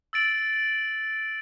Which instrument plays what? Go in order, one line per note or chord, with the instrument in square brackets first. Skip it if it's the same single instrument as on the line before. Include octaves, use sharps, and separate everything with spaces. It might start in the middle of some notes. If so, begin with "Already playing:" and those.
[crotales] E6 A6 D7 F#7